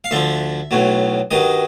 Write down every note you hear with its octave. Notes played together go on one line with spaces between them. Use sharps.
F5
D2 D3 F3 E5
B1 A2 F#3
G2 D#3 F#3 D#5